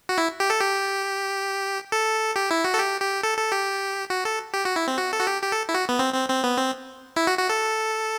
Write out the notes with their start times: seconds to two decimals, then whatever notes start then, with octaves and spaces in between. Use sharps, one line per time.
0.09 F#4
0.18 E4
0.40 G4
0.50 A4
0.61 G4
1.92 A4
2.36 G4
2.51 E4
2.64 F#4
2.74 A4
2.79 G4
3.01 G4
3.23 A4
3.38 A4
3.52 G4
4.10 F#4
4.25 A4
4.54 G4
4.65 F#4
4.76 E4
4.88 C4
4.98 F#4
5.13 A4
5.20 F#4
5.27 G4
5.42 G4
5.52 A4
5.69 E4
5.74 F#4
5.89 B3
5.99 C4
6.14 C4
6.29 C4
6.44 B3
6.58 C4
7.16 E4
7.27 F#4
7.38 F#4
7.49 A4